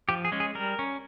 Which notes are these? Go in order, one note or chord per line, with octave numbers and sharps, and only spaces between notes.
F3 G4
G#4
G#3 C#4
G#4
G3 A#4
C#4